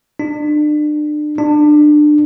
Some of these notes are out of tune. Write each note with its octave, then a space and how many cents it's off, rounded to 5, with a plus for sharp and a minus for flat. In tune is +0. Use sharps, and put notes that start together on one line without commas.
D4 +35
D4 +25